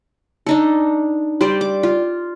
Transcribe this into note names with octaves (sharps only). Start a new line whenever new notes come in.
D4 D#4 A4
G3 C5 D5
D6
F4